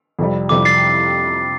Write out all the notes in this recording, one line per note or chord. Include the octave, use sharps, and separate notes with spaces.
F2 C3 G3
F2 C3 G3 D6
A6 C7